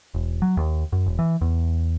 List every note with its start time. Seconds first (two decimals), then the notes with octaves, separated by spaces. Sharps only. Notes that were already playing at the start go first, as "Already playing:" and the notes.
0.14 E1
0.42 F#3
0.57 D#2
0.92 F#2
1.06 E1
1.19 E3
1.41 E2